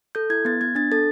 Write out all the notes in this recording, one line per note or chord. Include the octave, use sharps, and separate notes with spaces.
A4 G6
E4 G#6
B3 A6
B3 G#6
D4 A6
A4 A6